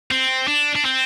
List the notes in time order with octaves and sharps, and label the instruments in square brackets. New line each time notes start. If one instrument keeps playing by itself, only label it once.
[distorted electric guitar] C4
D4
D4
C4